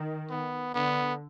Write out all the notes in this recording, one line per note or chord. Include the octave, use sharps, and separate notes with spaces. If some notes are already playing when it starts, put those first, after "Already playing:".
Already playing: D#3
B3
D3 B3